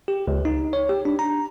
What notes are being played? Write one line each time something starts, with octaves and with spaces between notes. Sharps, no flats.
G4
C#2
D#4
C#5
G4
D4
A#5